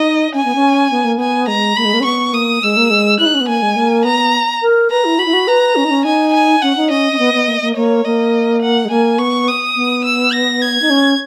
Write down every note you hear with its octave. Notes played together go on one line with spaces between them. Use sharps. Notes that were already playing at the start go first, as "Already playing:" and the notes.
Already playing: D#4 D#5
C#4 G#5
B3
C#4
B3
A#3
B3 G#5
G#3 A#5
A#3 B5
G#3
A#3
C#4
B3 C#6
A#3 D#6
G#3 E6
A#3
G#3
E4 F#6
D#4
C#4
B3
A#3 G#5
G#3
A#3
B3 A#5
A#4
B4 A#5
E4
F#4 B5
E4
F#4
B4 A#5
C#4
D#4
C#4
D#4 G#5
G#5
C#4 F#5
D#4
C#4 D#5
C#4
B3
B3
A#3
A#3
A#3 C#5
A#3 D#5
F#5
G#3
A#3 G#5
B3 C#6
D#6
B3
E6
A#6
G#6
D#4
C#4